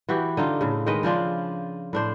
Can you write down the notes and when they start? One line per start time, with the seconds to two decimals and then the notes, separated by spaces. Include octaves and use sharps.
0.09 E3 E4 F#4 G4
0.37 D3 D#4 F4
0.61 A2 C#3
0.86 D#3 G#3 B4 D#5
1.03 C#3 F3 D4 F4
1.93 A2 D4 C5